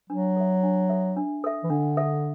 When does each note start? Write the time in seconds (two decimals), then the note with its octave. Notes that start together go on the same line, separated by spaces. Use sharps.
0.09 F#3 D4
0.36 A4 E5
0.63 D4
0.89 A4 E5
1.17 D4
1.44 A4 E5
1.64 E3
1.70 D3 D4
1.97 A4 E5